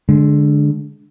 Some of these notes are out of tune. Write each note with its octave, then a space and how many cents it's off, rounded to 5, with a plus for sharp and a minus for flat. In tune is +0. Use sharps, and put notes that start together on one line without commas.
D3 +0 G#3 +20